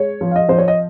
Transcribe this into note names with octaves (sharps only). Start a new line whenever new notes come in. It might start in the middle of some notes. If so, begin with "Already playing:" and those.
Already playing: G#3 C#5
F3
F5
D#5
F3 C5
C#5
D#5